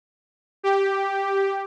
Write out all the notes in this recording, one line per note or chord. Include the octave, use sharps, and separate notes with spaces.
G4